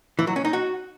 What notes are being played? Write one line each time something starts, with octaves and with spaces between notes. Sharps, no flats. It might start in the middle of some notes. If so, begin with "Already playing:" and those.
E3
F#3
C#4
D#4
F#4